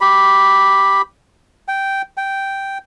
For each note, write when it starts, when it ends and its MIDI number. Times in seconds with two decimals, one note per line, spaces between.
0.01 1.01 67
0.01 1.01 83
1.68 2.02 79
2.17 2.78 79